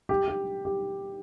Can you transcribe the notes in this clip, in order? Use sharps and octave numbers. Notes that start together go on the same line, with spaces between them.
G4
G4
G4